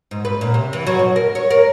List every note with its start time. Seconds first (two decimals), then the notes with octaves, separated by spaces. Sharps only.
0.11 G#2
0.25 B4
0.41 A#2
0.54 C3
0.73 E3
0.87 F#3
0.99 B2
1.16 A#4
1.35 C#5
1.50 A#4